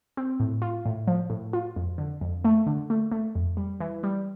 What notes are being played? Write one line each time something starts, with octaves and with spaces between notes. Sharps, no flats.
C4
A2
F4
A2
F3
A2
F4
F2
D3
F2
A3
D3
A3
A3
F2
G3
E3
G3